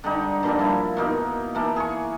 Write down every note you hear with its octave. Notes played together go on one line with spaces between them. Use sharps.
D3 G3 D#4
G2 A#2 F3 G3
F3 E4
B2 A#3 D#4
E3 A#3 A4
G#4 C#6